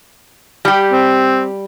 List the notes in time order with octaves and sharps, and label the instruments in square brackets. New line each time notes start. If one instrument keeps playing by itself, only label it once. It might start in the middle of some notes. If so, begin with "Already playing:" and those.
[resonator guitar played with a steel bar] G3 G4
[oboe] C4